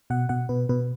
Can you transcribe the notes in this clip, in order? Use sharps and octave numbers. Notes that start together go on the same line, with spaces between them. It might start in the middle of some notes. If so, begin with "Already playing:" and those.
B2 F#5
B2 F#5
B2 B4
B2 B4